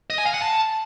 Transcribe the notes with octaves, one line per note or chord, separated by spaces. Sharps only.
D#5
G#5
F5
F#5
A5